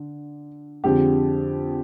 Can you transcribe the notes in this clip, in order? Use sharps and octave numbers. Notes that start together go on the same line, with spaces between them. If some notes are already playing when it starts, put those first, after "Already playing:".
Already playing: D3
F2 D3 G#3 G4